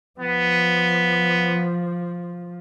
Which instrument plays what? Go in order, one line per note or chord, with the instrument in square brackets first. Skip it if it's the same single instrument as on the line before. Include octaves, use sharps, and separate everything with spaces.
[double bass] F3 [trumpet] B3